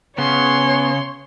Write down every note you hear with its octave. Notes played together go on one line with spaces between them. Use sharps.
C#3 B3 C#5 C6